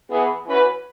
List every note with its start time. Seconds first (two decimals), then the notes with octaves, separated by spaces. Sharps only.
0.10 E3 B3 G#4
0.46 E3 C#4 F#4 B4